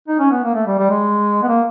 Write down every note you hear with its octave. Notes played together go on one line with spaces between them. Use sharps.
D#4
C#4
B3
A#3
A3
G3
G3
G#3
B3
A#3